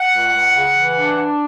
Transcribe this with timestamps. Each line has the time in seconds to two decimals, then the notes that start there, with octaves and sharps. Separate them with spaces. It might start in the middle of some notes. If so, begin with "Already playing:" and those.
Already playing: F#5
0.14 C#2
0.35 C#2
0.56 C#3
0.76 E3
0.97 D4
1.18 D4